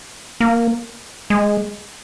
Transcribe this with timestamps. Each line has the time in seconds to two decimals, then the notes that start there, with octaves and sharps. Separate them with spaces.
0.40 A#3
1.30 G#3